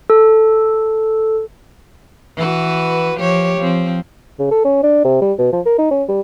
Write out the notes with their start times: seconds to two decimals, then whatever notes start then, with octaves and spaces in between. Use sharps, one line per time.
0.10 A4
2.37 E3 F#4 B4
3.17 F3 G4 C#5
3.58 F3 C4
4.39 C#3
4.51 A4
4.64 C#4
4.83 D4
5.04 C3
5.22 G3
5.38 B2
5.52 F3
5.66 A#4
5.78 D#4
5.91 C#4
6.08 G3